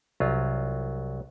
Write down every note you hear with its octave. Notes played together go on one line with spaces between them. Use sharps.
C2 F#3 F4